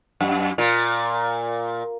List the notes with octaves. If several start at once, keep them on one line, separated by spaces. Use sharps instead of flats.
F#2
A#2